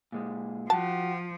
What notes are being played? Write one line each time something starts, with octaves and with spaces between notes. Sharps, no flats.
A#2 G#3
F3 F#4 G5 A5